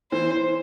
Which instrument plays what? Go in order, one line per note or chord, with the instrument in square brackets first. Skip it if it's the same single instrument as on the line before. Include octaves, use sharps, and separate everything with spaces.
[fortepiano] E3 [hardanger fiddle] C5